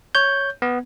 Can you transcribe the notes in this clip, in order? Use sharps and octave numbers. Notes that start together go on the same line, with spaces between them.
C#5 G6
B3